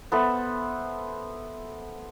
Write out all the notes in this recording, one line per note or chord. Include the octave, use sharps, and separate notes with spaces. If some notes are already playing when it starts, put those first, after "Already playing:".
B3 A4 C5 E5